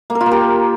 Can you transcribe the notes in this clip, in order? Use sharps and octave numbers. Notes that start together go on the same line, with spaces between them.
A#3
A#4
F4
A#3
G4